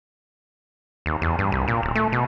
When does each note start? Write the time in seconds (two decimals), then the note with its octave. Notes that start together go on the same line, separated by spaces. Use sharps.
1.06 D#2
1.22 E2
1.39 G2
1.52 C2
1.68 A#2
1.83 D1
1.95 A3
2.12 B2